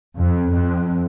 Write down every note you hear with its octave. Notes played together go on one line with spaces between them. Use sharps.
F2
F2